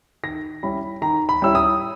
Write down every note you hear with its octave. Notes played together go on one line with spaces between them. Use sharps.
D#3 A#6
G3 C#4 E4 B5
D#3 A#5
B5
G3 C#4 E4 E6
D#6